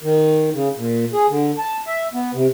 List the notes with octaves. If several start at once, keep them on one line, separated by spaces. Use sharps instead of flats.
D#3
C#3
A#2
G#4
D3
A5
E5
B3
C3